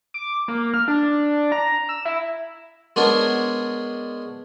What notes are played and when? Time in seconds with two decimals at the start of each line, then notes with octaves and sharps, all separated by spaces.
0.14 D6
0.48 A#3
0.74 F6
0.88 D4
1.52 A#5
1.89 E6
2.05 E4
2.96 G#3 B3 D4 G#4 A#4 C#5